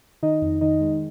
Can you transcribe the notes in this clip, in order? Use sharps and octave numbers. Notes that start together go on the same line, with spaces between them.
D#3 D#4 D#5
F2
D#3 D#4 D#5
G#3